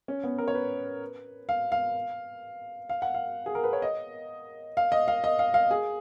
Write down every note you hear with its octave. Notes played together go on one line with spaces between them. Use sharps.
C#4
B3
A#4
C#5
B4
F5
F5
F5
F#5
F5
G#4
A#4
B4
C#5
D#5
F5
D#5
F5
D#5
F5
F5
G#4